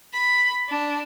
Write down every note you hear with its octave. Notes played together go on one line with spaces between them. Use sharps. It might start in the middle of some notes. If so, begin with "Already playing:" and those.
B5
D4